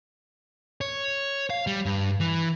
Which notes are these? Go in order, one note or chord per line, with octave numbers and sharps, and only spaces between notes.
C#5
F5
G3
G2
E3